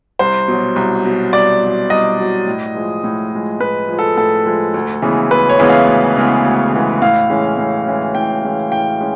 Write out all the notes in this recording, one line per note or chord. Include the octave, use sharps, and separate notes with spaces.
C2 C5
B2 F#3
C2
B2 F#3
C2 D5
B2 F#3
C2 D#5
B2 F#3
A2
F3 G#3
A2
F3 G#3
A2 B4
F3 G#3
A4
A2 A4
F3 G#3
D2
C#3 E3 G#3 B3
D2 B4
C#5
C#3 E3 G#3 B3
F5
D2
C#3 E3 G#3 B3
D2
C#3 E3 G#3 B3
A2 F5
E3 G#3 C#4
A2
E3 G#3 C#4
A2 G5
E3 G#3 C#4
A2 G5
G#3 C#4